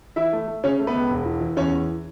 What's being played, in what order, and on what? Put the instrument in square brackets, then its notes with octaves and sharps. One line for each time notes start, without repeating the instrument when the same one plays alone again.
[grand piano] E3 E4 E5
A3
A3
C#3 C#4 C#5
A3
B3 B4
C#2
E1
E3
E3
E2 C#4 C#5
E3